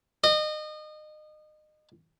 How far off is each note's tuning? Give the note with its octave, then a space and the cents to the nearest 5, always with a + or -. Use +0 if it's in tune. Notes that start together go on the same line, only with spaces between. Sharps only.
D#5 -30